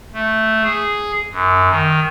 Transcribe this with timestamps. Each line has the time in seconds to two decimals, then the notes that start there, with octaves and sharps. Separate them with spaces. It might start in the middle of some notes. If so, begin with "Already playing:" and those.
0.14 A3
0.63 G#4
1.32 F#2
1.70 D#3